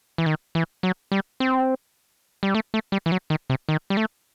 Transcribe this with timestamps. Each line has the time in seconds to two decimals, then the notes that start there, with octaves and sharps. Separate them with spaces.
0.18 E3
0.26 D#3
0.55 E3
0.83 F#3
1.12 G3
1.40 C4
2.43 G3
2.55 A3
2.74 A3
2.92 G3
3.06 E3
3.12 F#3
3.30 D#3
3.50 C3
3.69 D#3
3.90 G3
3.97 A3